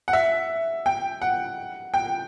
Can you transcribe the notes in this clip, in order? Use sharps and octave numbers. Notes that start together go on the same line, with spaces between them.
F#5
E5
G5
F#5
G5